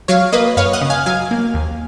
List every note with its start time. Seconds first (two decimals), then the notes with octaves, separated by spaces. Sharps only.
0.08 F#3 C#5 F5
0.32 A#3 B4 D#5
0.57 F#2 C#5 F5
0.73 D#5 F#5
0.81 C#3
0.90 F5 G#5
1.06 F#3 F5 G#5
1.31 A#3
1.54 D#2